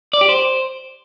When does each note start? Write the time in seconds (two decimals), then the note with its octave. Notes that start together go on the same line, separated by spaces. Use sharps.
0.13 D5
0.21 G4
0.29 C5